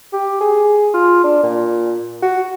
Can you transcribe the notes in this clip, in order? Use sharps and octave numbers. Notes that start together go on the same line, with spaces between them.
G4
G#4
F4
D4
A#2
F#4